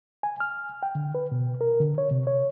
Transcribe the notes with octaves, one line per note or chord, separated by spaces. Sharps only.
G#5
F6
G5
D3
B4
B2
A#4
D3
C#5
C3
C#5